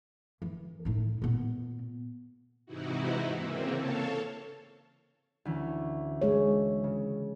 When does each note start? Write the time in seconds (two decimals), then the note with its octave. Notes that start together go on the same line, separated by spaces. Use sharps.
0.42 E3
0.85 A2 D#4
1.22 A#2 B3
2.66 G#2 C3 E3 D#4 E4 F#4
3.32 C#3 E3 A#3 C4
3.75 A4 C#5 F5 A5
5.45 D2 E3 C#4
6.22 G#3 G#4 C#5
6.84 C#3